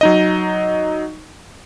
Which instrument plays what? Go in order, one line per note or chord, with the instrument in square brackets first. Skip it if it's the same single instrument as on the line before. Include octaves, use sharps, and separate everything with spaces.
[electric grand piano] F#3 D#4 D#5